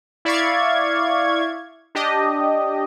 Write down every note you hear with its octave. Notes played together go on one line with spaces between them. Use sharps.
E4 D5 E5 F5 C#6 G#6
D4 G4 D#5